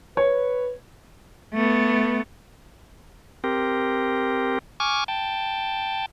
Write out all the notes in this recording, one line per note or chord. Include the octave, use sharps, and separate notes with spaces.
B4 C#5
A3 B3
C4 G4 A#4
G#5 C#6 D6 F6
G5 A5